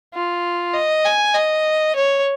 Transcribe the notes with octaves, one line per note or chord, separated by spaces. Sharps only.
F4
D#5
G#5
D#5
C#5